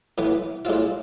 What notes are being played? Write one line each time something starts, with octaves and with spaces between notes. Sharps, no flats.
A2 E3 B3
A2 G#3 C4 F4